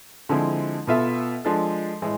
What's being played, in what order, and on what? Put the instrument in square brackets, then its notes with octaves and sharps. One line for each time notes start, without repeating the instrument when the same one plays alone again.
[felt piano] D3 F3 G#3 C4 E4
B2 B3 F4 A4 E5
F3 G#3 D4 A4
A2 E3 G#3